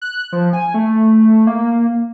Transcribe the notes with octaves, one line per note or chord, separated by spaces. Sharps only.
F#6
F3
G#5
A3
A#3